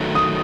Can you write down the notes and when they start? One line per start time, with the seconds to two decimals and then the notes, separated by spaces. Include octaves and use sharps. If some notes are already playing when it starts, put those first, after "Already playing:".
Already playing: D#3 F#3 A3
0.15 D#6